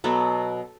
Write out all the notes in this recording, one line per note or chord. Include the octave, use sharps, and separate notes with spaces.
B2 F#3 B3 A4